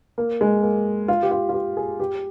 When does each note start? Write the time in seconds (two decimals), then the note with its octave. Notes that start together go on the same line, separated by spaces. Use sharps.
0.18 A#3
0.41 G#3
0.63 A#3
1.08 F4
1.23 G4
1.31 F4
1.49 F4
1.54 G4
1.77 G#4
2.00 G4